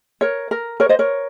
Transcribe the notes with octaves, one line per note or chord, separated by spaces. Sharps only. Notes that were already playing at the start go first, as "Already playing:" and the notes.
A#4 C#5
A#4
A#4 C#5
C5 D#5
A#4 C#5